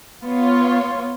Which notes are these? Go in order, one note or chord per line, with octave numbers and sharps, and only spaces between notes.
B3 F4 C#5